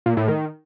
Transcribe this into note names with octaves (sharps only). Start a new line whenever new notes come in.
A#2
A2
D#3